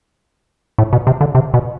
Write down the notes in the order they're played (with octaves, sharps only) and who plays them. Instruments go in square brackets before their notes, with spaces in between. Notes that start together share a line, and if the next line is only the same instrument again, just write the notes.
[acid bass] A2
B2
C3
D3
C3
B2